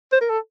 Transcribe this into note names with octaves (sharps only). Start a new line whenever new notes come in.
C5
A#4
A4